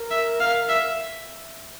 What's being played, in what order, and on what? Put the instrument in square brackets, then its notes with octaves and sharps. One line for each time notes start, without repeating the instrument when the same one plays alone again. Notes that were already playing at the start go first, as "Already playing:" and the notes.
Already playing: [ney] A#4
[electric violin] E5
F5
E5